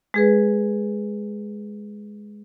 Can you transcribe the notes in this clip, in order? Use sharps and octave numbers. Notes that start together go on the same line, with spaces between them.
G#3 G#4 B4